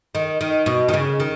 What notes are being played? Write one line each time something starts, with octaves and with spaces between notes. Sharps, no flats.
D#3
D#3
B2
D#3
C#3
D#3